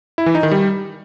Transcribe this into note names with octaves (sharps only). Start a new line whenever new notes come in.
E4
E3
D#4
D#3
G3